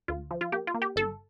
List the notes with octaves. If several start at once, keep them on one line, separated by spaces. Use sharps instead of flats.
D2 F4
F3
F4
A#3 G4
F4
A#3
G4
G1 A4